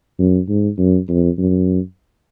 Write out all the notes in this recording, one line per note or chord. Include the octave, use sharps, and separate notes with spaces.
F#2
G#2
F#2
F2
F#2